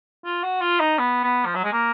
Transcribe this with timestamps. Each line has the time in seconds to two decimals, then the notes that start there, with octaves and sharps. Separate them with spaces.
0.25 F4
0.43 F#4
0.61 F4
0.80 D#4
0.98 B3
1.24 B3
1.46 F3
1.55 F#3
1.64 G#3
1.73 A#3